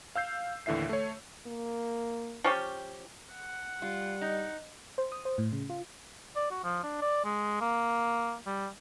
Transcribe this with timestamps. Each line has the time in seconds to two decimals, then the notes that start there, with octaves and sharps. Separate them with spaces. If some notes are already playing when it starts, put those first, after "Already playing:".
0.15 F5 E6 G6 C7
0.66 D#2 A2 D3 E3 E5 C7
0.89 A3 C#5
1.46 A#3
2.44 F3 C#4 G4
3.34 F#5
3.82 G3 F4
4.21 D#4
4.98 C5
5.12 D#6
5.25 C5
5.38 A2
5.53 C#3
5.70 F4
6.36 D5
6.50 F#4
6.64 F3
6.83 D4
7.02 D5
7.24 G#3
7.61 A#3
8.46 G3